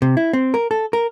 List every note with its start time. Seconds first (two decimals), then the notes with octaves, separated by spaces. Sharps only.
0.02 C3
0.17 E4
0.33 C4
0.54 A#4
0.71 A4
0.93 A#4